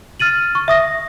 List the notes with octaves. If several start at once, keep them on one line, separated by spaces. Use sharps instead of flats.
F6 A6 D#7 F#7
C#6
E5 D#6 A#6